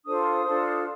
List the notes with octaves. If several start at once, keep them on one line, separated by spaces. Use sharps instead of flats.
D4 F4 A4 C5 D#6
D4 F4 A4 C5